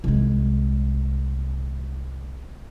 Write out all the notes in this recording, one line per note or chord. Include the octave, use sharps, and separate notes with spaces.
C2 G#3